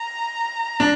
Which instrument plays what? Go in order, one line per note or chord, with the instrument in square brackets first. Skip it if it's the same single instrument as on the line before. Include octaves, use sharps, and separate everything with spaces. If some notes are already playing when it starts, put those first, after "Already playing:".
Already playing: [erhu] A#5
[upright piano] D4